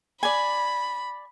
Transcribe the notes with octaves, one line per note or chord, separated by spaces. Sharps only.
D5 G#5 B5